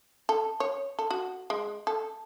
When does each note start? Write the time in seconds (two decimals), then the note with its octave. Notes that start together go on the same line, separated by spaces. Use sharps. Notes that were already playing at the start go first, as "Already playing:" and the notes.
0.29 A4
0.60 C#5
0.99 A4
1.11 F#4
1.50 G#3
1.87 A4